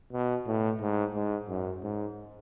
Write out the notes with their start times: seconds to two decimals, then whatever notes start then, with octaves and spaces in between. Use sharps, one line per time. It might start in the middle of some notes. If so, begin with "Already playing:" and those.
0.13 B2
0.47 A2
0.81 G#2
1.15 G#2
1.49 F#2
1.83 G#2